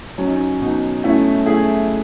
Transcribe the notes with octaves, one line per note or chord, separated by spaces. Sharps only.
F#3 C#4
D#4
C#4
B2 D#4
A3 C#4 E4
A3 E4 G#4